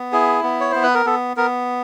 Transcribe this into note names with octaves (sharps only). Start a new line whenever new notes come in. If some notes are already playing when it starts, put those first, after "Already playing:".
Already playing: B3
E4 G#4
B3
C#5
B3 C5
B4
A#4
B3 A4
B3 A#4